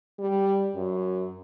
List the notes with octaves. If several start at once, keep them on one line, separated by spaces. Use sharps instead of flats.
G3
F#2